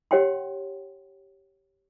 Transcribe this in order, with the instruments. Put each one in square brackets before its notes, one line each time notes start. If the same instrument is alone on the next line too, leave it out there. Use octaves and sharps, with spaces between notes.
[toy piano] G4 C#5 F#5 G5 C6